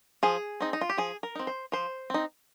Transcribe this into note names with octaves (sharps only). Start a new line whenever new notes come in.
F3 G#4
C4 D#4
D#4
F4
G4
F3 G#4
A#4
C4 D#4
C5
F3 C5
C4 D#4